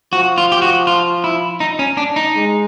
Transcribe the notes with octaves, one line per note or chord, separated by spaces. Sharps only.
F3 F#4
F4
G4
F#4
F4
E4
D#4
C#4
D4
D#4
G#3